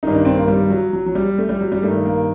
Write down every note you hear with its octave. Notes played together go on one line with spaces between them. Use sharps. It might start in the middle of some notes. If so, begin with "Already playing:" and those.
G2 D#3 D#4
D4
C4
A#3
G3
F#3
F#3
F#3
G3
A3
G3
F#3
G3
G2 D#3 A3
A#3